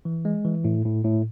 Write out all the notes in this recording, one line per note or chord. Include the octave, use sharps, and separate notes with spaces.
E3
G#3
E3
A2
A2
A2